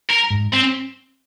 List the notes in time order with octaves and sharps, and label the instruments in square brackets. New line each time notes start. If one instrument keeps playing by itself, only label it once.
[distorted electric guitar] A#4
[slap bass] G#2
[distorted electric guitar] C4